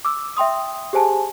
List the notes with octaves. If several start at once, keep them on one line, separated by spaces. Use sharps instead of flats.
D6 E6
E5 G5 C6 D#6
G4 G#4 C5 G#5 A5